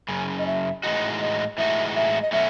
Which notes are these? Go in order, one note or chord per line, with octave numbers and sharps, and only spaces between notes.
F#2 C#3
D#5
E5
A2 E3 G#3 D#4 F#4 D#5
D#5
A2 E3 G#3 D#4 F#4 E5
E5
D#5
B2 F#3 A3 C#4 F#4 E5